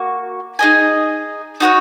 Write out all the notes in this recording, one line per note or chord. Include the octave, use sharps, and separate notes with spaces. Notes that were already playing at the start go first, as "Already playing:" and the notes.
Already playing: A#3 F#4
D#4 G#4 D#5 G#5
D#4 F#4 C#5 F#5